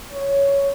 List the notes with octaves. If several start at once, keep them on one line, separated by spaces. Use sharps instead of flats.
C#5